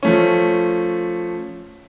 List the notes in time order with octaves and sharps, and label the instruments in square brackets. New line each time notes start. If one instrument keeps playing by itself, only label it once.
[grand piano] F3 A3 C#4